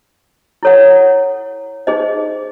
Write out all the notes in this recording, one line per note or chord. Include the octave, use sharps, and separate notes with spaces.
E4 A4 C#5 F#5
D#4 G#4 C5 D#5